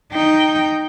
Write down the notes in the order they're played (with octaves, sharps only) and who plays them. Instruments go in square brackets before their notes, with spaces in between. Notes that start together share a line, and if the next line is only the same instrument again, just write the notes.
[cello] D#4 G5